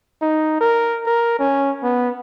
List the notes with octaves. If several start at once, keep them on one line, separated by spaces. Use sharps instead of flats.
D#4
A#4
A#4
C#4
B3